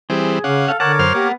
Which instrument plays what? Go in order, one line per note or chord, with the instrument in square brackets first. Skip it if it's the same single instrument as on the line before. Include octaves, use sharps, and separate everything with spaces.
[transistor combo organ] E3 G3 C4 [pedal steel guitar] G#4
[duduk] C#3 [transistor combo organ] C#4 F#5 [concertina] F5 D6
[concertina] A4 [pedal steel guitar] F5
[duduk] D3 [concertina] A#4 C#5 D6 [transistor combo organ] F#5 [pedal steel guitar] A5
[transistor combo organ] F#2 C6 F6 [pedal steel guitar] C5
[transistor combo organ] A#3 [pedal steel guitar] B3 [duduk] G4